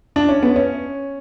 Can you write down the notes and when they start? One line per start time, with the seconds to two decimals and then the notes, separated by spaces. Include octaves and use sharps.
0.16 D4
0.29 C#4
0.43 B3
0.56 C#4